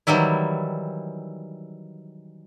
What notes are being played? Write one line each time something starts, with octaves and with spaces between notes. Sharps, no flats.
D#3 E3 F#3 G3 E4